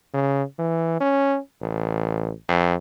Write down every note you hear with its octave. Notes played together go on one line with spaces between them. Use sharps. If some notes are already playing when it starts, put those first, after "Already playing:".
C#3
E3
C#4
A1
F2